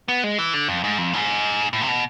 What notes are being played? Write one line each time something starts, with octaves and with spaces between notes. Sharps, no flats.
B3
G#3
E3
D3
F2
G#2
F2
G#2
A2
C3
B2